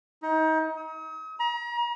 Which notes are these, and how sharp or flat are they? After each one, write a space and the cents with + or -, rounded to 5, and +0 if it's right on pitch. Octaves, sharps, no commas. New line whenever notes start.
D#4 +30
D#6 +40
A#5 +40